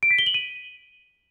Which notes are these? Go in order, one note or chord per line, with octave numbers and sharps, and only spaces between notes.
D7
B6
G7
F#7
D#7